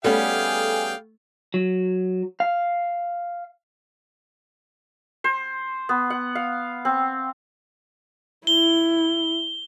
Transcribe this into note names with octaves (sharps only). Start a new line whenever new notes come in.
G3 A3 B3 C#4 G#4 F5 G5
F#3
F5
C5
B3
F#5
F5
C4
E4 G7